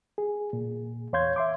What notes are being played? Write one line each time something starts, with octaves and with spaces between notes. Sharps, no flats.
G#4
A#2
E2 C#5 F5 C6 G6 G#6
E5 C6 D6